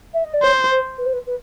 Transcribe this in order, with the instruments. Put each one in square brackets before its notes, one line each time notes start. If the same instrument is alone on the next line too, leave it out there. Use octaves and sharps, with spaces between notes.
[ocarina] E5
D#5
D5
[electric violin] C5 [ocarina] C#5
[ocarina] C5
B4
C5
B4
B4